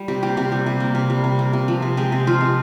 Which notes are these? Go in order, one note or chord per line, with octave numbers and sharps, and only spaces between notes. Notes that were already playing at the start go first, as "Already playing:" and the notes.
Already playing: G3
C3 G4
A#3 G4
C3 G4
G3
C3
A#3
C3
G3
C3
A#3
C3
F3
C3
G#3 G4
C3
F3 F4
C3